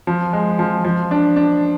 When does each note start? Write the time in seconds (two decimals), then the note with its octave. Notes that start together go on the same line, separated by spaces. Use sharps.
0.07 F3
0.33 G#3
0.59 F3
0.84 F3
1.11 D4
1.36 D4